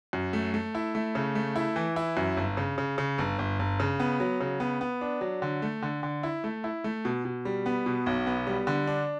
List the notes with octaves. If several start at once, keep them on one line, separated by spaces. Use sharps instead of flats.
F#2
A3
A3
E4
A3
C#3
A3
E4
E3
E4
F#2
G1
C#3
C#3
C#3
G1
G1
G1
C#3
B3
F#3
C#3
B3
B3
D4
F#3
D3
A3
D3
D3
E4
A3
E4
A3
B2
B2
G3
B3
B2
B1
B3
G3
D3
D4